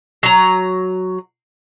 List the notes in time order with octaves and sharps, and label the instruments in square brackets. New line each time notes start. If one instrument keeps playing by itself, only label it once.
[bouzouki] F#3 A#5